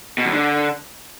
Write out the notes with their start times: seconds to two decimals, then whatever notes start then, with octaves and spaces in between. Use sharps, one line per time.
0.18 B2
0.26 E2
0.33 D3